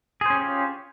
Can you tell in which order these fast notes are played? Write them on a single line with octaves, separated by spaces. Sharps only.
G#4 C5 C#4 G4 F4